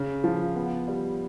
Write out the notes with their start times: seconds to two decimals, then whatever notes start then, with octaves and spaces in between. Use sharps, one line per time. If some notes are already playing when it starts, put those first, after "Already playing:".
Already playing: C#3
0.24 F3
0.55 B3
0.88 G3